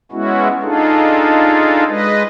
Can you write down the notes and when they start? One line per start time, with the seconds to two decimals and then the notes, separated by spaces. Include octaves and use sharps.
0.12 G#3 B3 C#4 E4 F#4
0.63 D4 D#4 F4 G#4 A4
1.88 G#3 B4 D#5